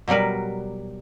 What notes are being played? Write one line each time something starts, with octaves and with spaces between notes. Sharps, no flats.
B2 F#3 G3 A#4 B4